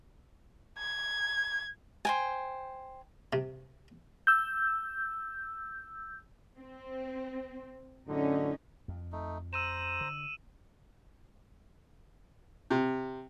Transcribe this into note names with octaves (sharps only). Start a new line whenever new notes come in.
G#6
C5 G5 G#5
C3
E6 G6
C4
F#2 A2 D3 C#4 D#4
F2
A3 D#4
C5 A#5 E6 D#7 E7
D3
C3